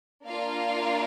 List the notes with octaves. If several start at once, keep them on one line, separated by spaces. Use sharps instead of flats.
A#3 D4 F4 A#4 F5